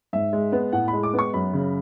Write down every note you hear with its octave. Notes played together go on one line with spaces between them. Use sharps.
G#2 E5
G#3
B3
A2 F#5
B5
G#3
D6
B3
C#6
F#2 B5
C#3